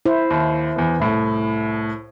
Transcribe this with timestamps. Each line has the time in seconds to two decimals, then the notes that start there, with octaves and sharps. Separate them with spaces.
0.05 E4 C5
0.30 D#2
0.76 E2 B3
1.00 C2 A2